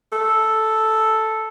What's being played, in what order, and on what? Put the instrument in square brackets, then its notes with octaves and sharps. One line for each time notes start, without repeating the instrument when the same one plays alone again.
[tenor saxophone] A4